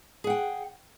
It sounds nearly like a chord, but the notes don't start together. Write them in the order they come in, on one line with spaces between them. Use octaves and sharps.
G#4 F#5 G5